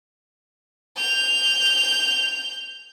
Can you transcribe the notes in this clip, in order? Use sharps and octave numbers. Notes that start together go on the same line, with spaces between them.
G6 F7